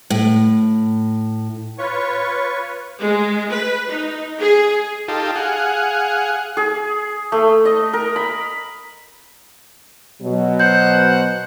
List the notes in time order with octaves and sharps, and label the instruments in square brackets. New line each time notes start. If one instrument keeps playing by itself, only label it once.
[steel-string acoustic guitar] A2
[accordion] F4 B4 C#5 C#6
[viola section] G#3
B4
D#4
G#4
[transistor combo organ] D#4 F4 G4 A4
G#4 F5 F#5
[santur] G#4
A3
D#5
A#4
B5
[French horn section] B2 F#3
[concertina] C5 F#5 F#6 [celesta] G6